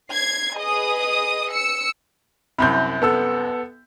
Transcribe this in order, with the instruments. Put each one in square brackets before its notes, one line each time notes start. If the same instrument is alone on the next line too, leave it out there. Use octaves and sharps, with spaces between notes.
[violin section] G#6 C7
G#4 B4 D#5 D#6
E6 C#7
[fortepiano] C2 F#2 C3 [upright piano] B5 G6
[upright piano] B3 A4 E6